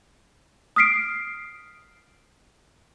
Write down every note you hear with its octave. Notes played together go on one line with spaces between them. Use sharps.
D#6 F6 B6 C7 D7